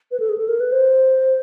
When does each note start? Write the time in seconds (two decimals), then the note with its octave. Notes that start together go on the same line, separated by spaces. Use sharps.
0.11 B4
0.20 A4
0.29 G#4
0.38 A4
0.48 A#4
0.60 B4
0.72 C5